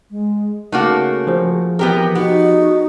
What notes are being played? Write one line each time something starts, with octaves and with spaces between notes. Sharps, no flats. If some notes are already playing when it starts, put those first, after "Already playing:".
G#3
C#3 A3 A#3 D#4 F#4
F3 G#4 C5
E3 B3 G4 A#4
B3 D#4 F#4